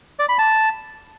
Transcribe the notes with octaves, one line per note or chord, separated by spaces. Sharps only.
D5
B5
A5